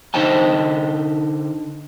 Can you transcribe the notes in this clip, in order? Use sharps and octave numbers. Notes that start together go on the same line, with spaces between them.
D3 D#4 C5 D#5 G5 A5